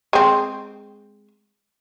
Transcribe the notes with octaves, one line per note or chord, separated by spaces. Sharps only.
G#3 C4